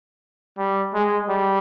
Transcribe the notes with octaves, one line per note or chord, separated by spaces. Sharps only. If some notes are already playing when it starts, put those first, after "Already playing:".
G3
G#3
G3